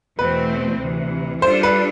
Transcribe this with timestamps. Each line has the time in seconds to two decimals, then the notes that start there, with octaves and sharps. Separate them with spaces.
0.19 E2 B2 A3 C4 B4
0.80 D2 C3 E3
1.42 G3 D4 F4 A4 C5
1.63 B4